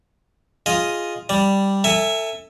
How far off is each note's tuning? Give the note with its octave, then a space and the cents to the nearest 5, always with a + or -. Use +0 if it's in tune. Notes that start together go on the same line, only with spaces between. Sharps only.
F4 +0 G#4 +0 D#5 +0
G3 +0 D5 +0
A4 +30 E5 +0 G#5 -10